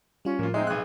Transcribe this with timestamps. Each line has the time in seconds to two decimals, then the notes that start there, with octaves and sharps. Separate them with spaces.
0.25 G3 C#4 F4
0.39 A2 F3 A#3 F4
0.54 G#3 C4 D#4 D#5 E5
0.67 B1 G#4 F5 F#6